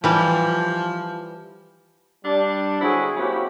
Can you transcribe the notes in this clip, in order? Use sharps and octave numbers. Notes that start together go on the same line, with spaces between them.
E3 F3 G3
G3 D4
D3 F#3 C4 E4 F#4 G#4
A#3 C4 C#4 E4 F#4 G4